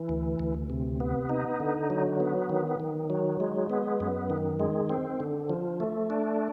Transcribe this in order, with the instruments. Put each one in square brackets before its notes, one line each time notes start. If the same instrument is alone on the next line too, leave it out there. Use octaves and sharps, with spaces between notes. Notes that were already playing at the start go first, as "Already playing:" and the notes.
Already playing: [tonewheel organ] E3
D2
D2
C3
B3
D#4
D3
F#3
B3
D#3
D#3
F#3
G#3
B3
F#2
D#3
G#3
C4
D3
F3
A3
D4